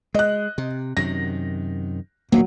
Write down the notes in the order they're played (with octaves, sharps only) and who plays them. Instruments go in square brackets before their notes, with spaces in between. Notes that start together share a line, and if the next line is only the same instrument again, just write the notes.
[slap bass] G#3 [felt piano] D#5 F#6
[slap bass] C3
[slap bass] F#2 C3 D#3 [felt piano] A#6
[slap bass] D#1 A#1 B2 [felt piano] F#3 [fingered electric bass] A#3